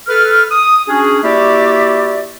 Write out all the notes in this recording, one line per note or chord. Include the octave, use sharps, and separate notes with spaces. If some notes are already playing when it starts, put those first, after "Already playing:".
A4 B4 F6
D#6
C#4 D4 F#4 G#4
A#3 E4 F#4 G4 D5 E5